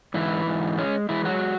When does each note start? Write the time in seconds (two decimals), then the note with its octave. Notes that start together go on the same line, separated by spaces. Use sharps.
0.14 G#2 E3 E4
0.47 G#2
0.78 G#3 C#4
1.09 E3 G#3 E4
1.25 F#3 F#4